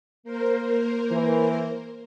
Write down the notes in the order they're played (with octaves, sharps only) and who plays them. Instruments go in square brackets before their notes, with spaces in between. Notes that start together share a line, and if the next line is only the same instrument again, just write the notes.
[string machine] A#3 A#4 C5
[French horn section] E3